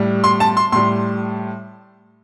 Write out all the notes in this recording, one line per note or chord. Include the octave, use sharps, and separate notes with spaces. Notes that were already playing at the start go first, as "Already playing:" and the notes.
Already playing: A2 G3
C6
A5
C6
A2 G3 C6